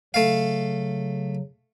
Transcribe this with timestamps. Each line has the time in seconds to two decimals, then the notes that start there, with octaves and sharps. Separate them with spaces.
0.14 C#3 F#3 A3 F5